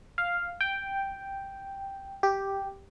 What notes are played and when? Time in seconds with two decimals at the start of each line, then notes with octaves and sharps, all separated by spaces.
0.18 F5
0.61 G5
2.23 G4